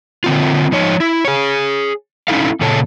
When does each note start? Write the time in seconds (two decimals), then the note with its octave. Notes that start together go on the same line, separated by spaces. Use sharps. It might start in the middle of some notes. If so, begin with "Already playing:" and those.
0.24 D3 C4 F4
0.72 F3 D#4 C#5
1.00 E4
1.25 G#4 C#5
2.28 C#4 D#4 E4 A4 F5
2.61 A#2 C#3 A4 C#5 A5